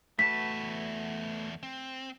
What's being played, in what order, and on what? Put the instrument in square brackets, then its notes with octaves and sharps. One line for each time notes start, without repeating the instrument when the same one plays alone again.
[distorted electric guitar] E2 A5 [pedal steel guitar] A3 F#4 B4 [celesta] B6
[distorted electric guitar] C4